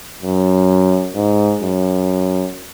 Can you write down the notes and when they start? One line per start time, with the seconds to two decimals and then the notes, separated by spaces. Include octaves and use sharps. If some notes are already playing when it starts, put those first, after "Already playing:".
0.22 F#2
1.16 G#2
1.63 F#2